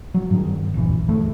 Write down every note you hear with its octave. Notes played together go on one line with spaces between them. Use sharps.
F#3
G2 D#3
D#1 A#1 E3
D#1 D2 G2 A3